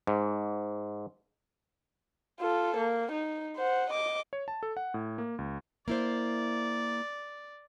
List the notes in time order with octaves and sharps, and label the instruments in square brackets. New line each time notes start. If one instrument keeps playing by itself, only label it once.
[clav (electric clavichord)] G#2
[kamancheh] F4 A4
A#3
D#4
C5 F#5
D#5 D6
[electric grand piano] C#5
A5
A4
F#5
A2
A#3
C#2
[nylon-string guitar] A#3 E4 C5 [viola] D5